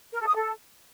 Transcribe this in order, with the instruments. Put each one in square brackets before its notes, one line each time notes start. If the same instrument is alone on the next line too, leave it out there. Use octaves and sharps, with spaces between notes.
[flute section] A#4
A4
D#6
A4